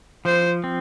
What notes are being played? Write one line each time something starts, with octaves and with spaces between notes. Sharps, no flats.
F3 C5
C4